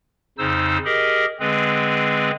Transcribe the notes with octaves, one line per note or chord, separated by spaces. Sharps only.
F2 C#3 D#4 C5 E6
G4 G#4 A#4 D#5
D3 G#3 C4 G#4 B4